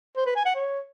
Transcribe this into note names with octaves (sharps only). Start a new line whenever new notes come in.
C5
B4
G#5
F#5
C#5